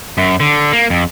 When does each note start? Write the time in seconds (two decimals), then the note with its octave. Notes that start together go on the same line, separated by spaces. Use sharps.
0.18 F#2
0.40 D3
0.73 A#3
0.90 F2